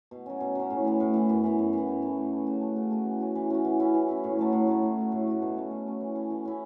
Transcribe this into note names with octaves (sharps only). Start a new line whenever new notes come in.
B2
F#3 C#4
B2
F#3 C#4
A2
E3 B3
A2
E3 B3
F#2
E3 B3
F#2
E3 B3
F#2
E3 A3
F#2
E3 A3
C#3
A3 F#4
C#3
A3 F#4
E3
C#4 F#4
E3
C#4 F#4
E3
C#4 E4
E3
C#4 E4
A2
F#3 A3
A2
F#3 A3
A2
A3 F#4
A2
A3 F#4
B2
A3 C#4
B2
A3 C#4
E3
C#4 E4
E3
C#4 E4